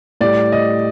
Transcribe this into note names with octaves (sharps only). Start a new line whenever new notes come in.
A2 G3 D5
D#5